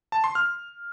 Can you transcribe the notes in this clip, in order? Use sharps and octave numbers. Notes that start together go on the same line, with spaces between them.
A5
C6
F6